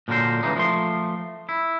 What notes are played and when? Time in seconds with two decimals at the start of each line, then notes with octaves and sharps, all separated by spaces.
0.08 A#2 D3 F#3 A#4 C5
0.43 C#2 E3 A#3 D#4
0.56 F3 A3 C6
1.49 E4